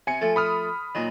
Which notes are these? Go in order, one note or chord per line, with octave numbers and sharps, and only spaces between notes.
C3 G#5 C#7
F3 A3 A4
B5 D#6 F6
A#2 D#3 F#3